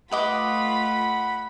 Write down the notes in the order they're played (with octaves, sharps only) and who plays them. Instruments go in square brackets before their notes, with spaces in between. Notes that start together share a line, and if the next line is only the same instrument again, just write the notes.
[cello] A3 F4 [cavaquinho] B4 D#5 D6 [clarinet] F#5 [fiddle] B5